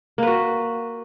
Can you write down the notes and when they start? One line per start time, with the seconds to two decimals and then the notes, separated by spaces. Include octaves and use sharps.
0.18 A#3
0.23 B4
0.27 F#4